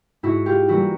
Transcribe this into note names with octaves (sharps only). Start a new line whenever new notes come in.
G#2 E4 F#4
F4 G4
E3 G3 A#3 E4 F#4